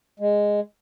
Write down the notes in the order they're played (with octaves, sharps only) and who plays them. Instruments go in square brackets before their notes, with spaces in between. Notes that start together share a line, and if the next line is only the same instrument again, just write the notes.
[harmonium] G#3